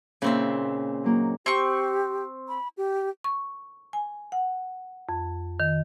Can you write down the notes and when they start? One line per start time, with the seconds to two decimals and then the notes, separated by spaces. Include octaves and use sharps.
0.22 A#2 C#3 C4 D#4 E5
1.04 F#3 A#3 D#4
1.46 C4 G4 C#6
2.49 B5
2.77 G4
3.24 C#6
3.93 G#5
4.32 F#5
5.09 F2
5.60 D#3